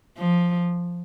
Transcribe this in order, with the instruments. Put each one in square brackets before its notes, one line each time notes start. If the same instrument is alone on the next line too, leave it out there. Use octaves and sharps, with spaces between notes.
[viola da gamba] F3